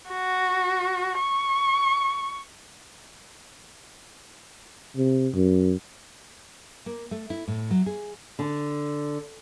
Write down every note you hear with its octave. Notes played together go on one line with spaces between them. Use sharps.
F#4
C#6
C3
F#2
A#3
A3
E4
A2
F#3
G#4
D3